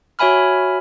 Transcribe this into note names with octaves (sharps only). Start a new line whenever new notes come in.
F#4 C#5 E5 G#5 B5 F6